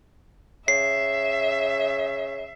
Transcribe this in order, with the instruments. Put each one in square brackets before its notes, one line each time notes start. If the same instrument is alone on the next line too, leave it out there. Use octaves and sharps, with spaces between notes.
[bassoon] C#3 [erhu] E5 [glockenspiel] C7